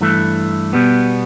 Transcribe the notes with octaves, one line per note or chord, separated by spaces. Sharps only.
G2 E3 A3
B2 G3 B3